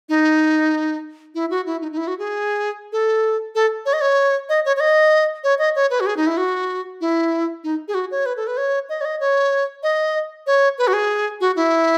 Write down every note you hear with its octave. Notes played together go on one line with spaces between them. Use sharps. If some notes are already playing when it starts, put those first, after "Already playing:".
D#4
E4
F#4
E4
D#4
D#4
E4
F#4
G#4
A4
A4
C#5
D#5
C#5
D#5
C#5
C#5
D#5
C#5
D#5
C#5
B4
F#4
G#4
D#4
E4
F#4
E4
D#4
G#4
F#4
C#5
B4
A4
B4
C#5
D#5
C#5
D#5
C#5
D#5
C#5
B4
F#4
G#4
F#4
E4